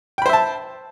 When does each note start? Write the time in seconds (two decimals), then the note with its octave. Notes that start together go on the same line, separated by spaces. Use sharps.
0.18 G5
0.22 B5
0.26 C5
0.29 E5
0.33 A5